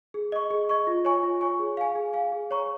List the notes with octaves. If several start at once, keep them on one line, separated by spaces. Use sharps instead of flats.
G#4
D#5 C#6
G#4
D#5 C#6
F4
C#5 G#5 C#6
F4
C#5 G#5 C#6
G#4
F5 G#5
G#4
F5 G#5
G#4
C#5 A#5 C#6